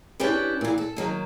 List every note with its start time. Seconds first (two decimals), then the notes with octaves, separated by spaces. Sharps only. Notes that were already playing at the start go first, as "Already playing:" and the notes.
0.20 C#4 D4 E4 G4 B4
0.61 A#2 E3
0.78 A4
0.97 D#3 F#3 A#3